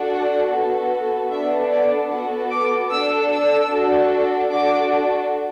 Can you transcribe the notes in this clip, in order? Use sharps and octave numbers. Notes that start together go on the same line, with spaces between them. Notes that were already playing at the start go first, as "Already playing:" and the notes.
Already playing: D4 F#4 A4
F#5
B3 F#4 A4
B3 D4 A4 E5
D5
B3 F#4 A4 F#5
D6
D4 A4 E6
E6
D4 F#4 A4
D4 F#4 A4 D6